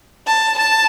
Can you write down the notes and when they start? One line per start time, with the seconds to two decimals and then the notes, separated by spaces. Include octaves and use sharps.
0.27 A5
0.58 A5